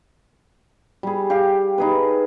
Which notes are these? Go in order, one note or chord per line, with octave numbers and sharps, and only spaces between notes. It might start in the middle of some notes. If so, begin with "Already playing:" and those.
G3 G#4
G4 F5
D#4 G#4 B4